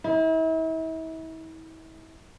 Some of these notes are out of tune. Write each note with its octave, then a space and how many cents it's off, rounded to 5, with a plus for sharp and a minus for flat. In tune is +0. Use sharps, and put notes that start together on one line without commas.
E4 -40